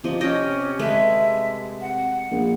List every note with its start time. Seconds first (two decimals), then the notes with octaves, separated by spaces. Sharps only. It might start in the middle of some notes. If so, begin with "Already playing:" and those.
0.04 C3 F3 D#5
0.21 C#4 G4 D#5 G5
0.79 G#3 A3 B4 E5
1.81 F#5
2.31 A#1